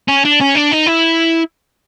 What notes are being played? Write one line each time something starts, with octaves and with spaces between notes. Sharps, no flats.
C#4
D4
C#4
D4
D#4
E4